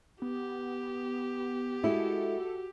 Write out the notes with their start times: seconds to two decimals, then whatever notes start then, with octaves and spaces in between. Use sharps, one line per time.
0.22 B3 G4
1.83 G#3 E4 F#4 A4